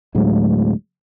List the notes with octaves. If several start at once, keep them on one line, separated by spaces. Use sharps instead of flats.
D2 A2 F#3 G#3